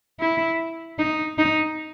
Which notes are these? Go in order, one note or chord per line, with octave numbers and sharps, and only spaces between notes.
E4
D#4
D#4